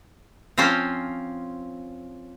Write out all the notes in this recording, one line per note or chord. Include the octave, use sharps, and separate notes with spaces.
F3 C4 C#4 F4 C5